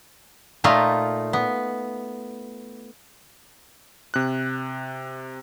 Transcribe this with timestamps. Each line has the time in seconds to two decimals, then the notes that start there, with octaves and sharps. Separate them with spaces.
0.64 A#2 A3 D#4 F4
1.33 B3
4.14 C3 F#6